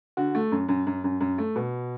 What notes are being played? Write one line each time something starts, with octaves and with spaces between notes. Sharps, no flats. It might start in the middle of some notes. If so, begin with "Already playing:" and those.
D3 F#4
A3
F#2
F#2
F#2
F#2
F#2
A3
B2